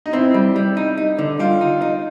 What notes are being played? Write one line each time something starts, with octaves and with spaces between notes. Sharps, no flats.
D#4
C4 E4
G3
G3
D#4
D#4
D3
G3 F4
D#4
D#4